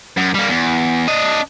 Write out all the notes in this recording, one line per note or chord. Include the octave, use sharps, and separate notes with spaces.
F#2
G3 A#3
E2
D4 D#5